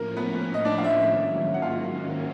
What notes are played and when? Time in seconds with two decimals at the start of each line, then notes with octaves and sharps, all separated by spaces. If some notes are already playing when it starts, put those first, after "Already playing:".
Already playing: A2 F3 A#3 C#4 A#4
0.17 B3 B4
0.54 D#5
0.65 D4 D5
0.78 F5
0.84 E4 E5
1.04 G#2 D#3 F#3 A#3 C#4
1.54 F#5
1.62 F4 F5